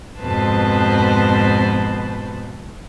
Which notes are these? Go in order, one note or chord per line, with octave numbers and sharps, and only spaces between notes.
F2 G#2 B2 B4 C5 A5